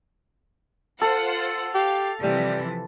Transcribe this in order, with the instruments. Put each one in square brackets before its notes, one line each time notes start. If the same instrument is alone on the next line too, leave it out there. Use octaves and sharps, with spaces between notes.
[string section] F4 C5 F#5 [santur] A4
[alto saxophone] G4 [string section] F5
[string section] C3 E3 F3 [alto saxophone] G3